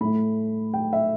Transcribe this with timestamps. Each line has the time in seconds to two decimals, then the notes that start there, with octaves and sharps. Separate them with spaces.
0.01 A2 A3 B5
0.74 G5
0.93 E5